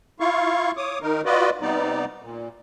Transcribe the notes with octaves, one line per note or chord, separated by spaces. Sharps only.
E4 F4 F5 C#6
C#5 D6 D#6
D#3 D#4 A#4
F4 F#4 B4 D5 D#5
C3 G3 B3 D#4 D5
A#2